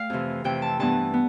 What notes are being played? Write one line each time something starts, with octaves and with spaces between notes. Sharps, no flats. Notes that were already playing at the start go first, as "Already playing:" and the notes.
Already playing: A3 D5 F5 G5
F2 C3 E3
F2 C3 E3 G5
A5
G2 E3 B3 A5
B3